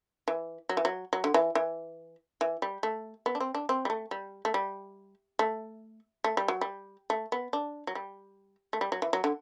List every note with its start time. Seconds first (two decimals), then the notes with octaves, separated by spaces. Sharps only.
0.28 E3
0.69 F#3
0.77 E3
0.85 F#3
1.13 F#3
1.24 D3
1.34 E3
1.55 E3
2.41 E3
2.62 G3
2.83 A3
3.26 B3
3.35 D4
3.40 C4
3.55 D4
3.69 C4
3.85 G3
3.90 A3
4.11 G3
4.45 A3
4.54 G3
5.39 A3
6.24 A3
6.37 G3
6.48 F#3
6.61 G3
7.10 A3
7.32 B3
7.53 D4
7.87 F#3
7.95 G3
8.73 A3
8.81 G3
8.92 F#3
9.02 E3
9.13 F#3
9.24 D3